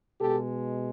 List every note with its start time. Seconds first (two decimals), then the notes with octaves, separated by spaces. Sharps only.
0.21 B2 G#3 G4 A4